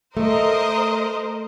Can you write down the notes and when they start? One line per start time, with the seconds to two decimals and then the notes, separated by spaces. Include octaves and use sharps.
0.17 A3 A#4 C5 D#5